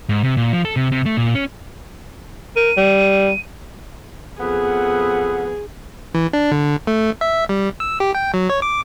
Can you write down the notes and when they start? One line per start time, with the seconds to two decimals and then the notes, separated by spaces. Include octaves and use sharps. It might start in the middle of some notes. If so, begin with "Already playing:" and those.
0.09 G#2
0.23 C3
0.37 A#2
0.53 F3
0.65 A4
0.76 C3
0.92 C3
1.06 A3
1.17 A#2
1.35 C#4
2.56 A#4 D#7
2.77 G3
4.40 F2 B3 G#4
6.15 E3
6.33 D4
6.51 D3
6.87 A3
7.21 E5
7.49 G3
7.80 E6
8.00 G4
8.15 G5
8.34 F#3
8.49 C#5
8.62 D6